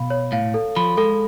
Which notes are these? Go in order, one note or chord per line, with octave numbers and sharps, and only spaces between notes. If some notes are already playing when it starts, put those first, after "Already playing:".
Already playing: B2 F5 B5
C#5
A2 F5
A4
F3 B5
G#3 A4